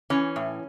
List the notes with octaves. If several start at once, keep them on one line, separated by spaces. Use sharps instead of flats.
E3 C#4
A2